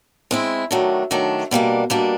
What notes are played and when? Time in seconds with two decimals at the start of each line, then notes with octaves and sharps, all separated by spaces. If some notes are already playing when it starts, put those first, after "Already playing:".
0.31 G#3 C4 E4
0.71 D#3 F#3 A3 D4
1.11 D#3 F#3 A3 D4
1.51 B2 G3 A#3 D4
1.90 B2 G3 A#3 D4